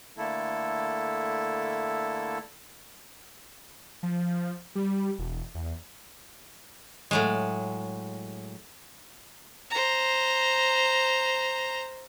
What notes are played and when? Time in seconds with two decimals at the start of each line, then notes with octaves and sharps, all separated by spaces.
0.18 D3 A3 A#3 E4 A4
4.03 F3
4.75 G3
5.19 E1
5.54 E2
7.11 A2 F#3 G#3
9.70 C5 A#5